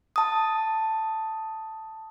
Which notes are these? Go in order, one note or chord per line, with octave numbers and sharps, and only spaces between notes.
A5 D#6